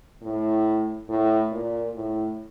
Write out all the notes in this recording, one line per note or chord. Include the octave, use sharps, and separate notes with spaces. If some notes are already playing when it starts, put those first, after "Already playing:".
A2
A2
A#2
A2